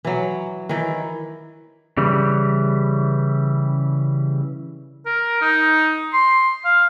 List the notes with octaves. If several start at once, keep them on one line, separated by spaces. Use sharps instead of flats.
E3 F#3
D#3 E3 E4
C#3 E3 G3
A#4
D#4
C6
F5